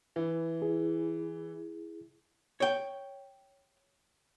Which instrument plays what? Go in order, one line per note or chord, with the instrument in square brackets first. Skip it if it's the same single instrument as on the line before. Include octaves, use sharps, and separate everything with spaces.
[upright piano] E3
[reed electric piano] E4 G#4
[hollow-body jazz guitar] C#5 G5